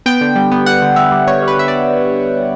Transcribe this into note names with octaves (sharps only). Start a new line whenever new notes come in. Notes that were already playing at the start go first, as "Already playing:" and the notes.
B3 G5
D3
G3
B3
G3 F#5
D3
D3 E5
G3
B3 C#5
G3
B4
D3 E5
D5